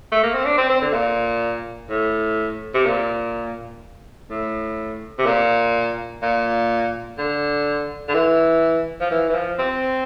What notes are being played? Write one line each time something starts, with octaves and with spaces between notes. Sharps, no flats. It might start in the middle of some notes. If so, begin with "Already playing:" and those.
A3
A#3
C4
D4
C4
C4
D3
A#2
A2
C3
A#2
A2
C3
A#2
A#2
D3
D3
E3
F3
E3
E3
F3
C4